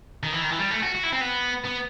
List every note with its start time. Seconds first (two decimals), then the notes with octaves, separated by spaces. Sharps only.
0.23 D#3
0.33 E3
0.42 D#3
0.50 E3
0.59 G3
0.71 A3
0.83 F#4
0.95 F#4
1.03 E4
1.13 C4
1.21 B3
1.65 B3